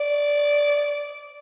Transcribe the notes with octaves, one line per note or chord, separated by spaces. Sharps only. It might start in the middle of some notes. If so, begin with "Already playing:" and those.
Already playing: D5